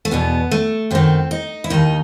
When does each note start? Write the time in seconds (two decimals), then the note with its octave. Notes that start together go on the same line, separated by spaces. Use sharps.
0.05 A3
0.11 E2 B2 B3
0.51 A3
0.91 F#2 D#3 C4
1.31 D#4
1.64 E4
1.70 D#2 D#3 D#4